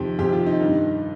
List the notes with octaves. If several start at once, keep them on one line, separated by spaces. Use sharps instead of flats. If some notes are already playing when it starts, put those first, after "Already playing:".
Already playing: F2 C3 D#3 G4
F2 C3 D#3 G4
F4
D#4
G2 D#3